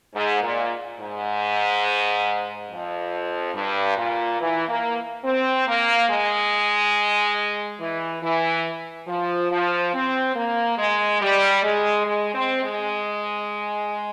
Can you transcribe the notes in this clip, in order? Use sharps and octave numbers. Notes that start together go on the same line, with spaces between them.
G#2
A#2
G#2
F2
G2
A#2
E3
A#3
C4
A#3
G#3
E3
E3
F3
F3
C4
A#3
G#3
G3
G#3
G#3
C4
G#3